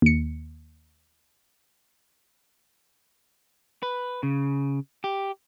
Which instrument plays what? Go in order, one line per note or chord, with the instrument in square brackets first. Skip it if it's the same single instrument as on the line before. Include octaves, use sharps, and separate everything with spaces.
[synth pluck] D#2 C#7
[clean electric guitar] B4
C#3
G4